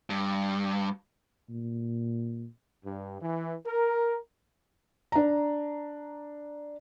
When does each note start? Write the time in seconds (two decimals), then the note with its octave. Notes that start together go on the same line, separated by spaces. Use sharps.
0.10 G2
1.50 A#2
2.86 G2
3.22 E3
3.66 A#4
5.12 D4 A#5